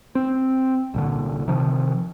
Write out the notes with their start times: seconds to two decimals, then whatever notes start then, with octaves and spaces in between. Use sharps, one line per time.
0.15 C4
0.94 C2 A#2 D3
1.48 C3 D#3 F3